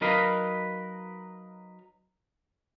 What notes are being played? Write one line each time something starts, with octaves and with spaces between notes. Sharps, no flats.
F#3 D#4 A#4 B4 D#5 F5